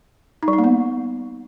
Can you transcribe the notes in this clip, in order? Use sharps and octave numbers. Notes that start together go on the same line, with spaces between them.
D#4
G3
D#4
A#3
B3